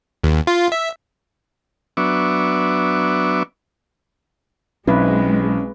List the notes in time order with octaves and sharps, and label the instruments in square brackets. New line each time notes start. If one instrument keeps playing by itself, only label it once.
[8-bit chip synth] D#2
F4
E5
[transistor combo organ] F#3 B3 D4 E5 C#6 D6
[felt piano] B1 E4 [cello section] G#3 [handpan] C4 B4 [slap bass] C#4